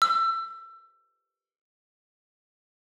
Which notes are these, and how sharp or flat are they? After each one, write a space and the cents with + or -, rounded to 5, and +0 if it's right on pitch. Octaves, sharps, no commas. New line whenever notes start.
E6 +25